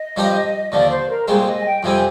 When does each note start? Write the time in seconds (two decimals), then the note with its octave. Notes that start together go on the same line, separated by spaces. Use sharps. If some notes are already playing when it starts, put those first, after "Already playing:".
Already playing: D#5
0.16 G2 F3 C4 G4 A#4
0.71 D#2 D3 F3 D5
0.90 C5
1.08 A#4
1.27 C2 A#2 G#3 C4 G#4
1.47 D#5
1.59 G#5
1.65 G5
1.83 F2 C3 G3 C4 G#5